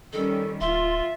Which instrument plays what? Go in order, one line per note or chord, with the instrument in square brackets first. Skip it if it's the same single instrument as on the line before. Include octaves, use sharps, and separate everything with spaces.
[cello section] D#3 G3 C#4 [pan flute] A4
[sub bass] D1 [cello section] F4 [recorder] E5 [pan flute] C6